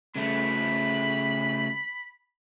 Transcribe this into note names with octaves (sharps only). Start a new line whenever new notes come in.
C#3 A3 B5